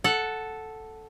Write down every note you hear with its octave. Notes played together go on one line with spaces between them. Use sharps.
A4 F#5